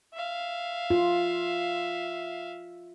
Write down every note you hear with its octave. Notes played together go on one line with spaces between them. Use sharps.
E5 F5
F4